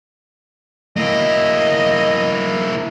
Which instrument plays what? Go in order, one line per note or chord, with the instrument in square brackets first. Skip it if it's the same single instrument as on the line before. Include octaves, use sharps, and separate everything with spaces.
[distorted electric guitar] A#3 E4 [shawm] D#5